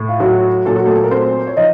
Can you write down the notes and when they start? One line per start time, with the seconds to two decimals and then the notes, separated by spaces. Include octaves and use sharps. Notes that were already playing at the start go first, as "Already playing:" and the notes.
Already playing: A2
0.09 F4
0.20 F#3 F#4
0.65 A#2 F#3 A4
0.76 F#4
0.85 A3 A4
0.96 A4
1.04 A#4
1.11 C4 C5
1.47 C#5
1.57 F3 D#4 D#5